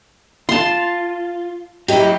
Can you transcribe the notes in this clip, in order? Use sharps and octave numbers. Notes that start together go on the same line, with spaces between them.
F4 A5 C6
F#3 E4 G4 D#5